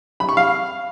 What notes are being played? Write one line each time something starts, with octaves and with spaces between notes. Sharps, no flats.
B5
C#6
F5